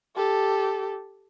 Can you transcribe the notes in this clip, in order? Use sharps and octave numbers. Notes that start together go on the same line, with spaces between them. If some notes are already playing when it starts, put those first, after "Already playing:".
G4 A4